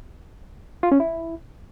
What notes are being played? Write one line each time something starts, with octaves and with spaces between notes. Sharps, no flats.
F4
C#4
E4